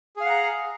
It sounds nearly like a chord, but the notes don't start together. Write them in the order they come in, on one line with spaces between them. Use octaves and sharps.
G#4 F5 F#5 A#5